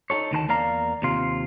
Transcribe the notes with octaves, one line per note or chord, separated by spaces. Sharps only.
D#4 F#4 A4 C#5
D2 D#3 B4 A5
E2 A#3 D5 F5 A#5
D#2 C3 F4